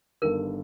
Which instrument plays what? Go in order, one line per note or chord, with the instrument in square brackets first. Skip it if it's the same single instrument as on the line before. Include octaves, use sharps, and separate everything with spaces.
[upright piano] G1 G2 D#3 [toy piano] A#4